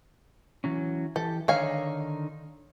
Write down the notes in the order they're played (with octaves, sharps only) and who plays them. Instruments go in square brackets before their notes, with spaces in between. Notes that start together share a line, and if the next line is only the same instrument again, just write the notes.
[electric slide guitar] E3 F#3 C#4
[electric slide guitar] E3 G4 [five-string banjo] A4
[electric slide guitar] D3 D#3 D#4 [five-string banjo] C#5 F5 G#5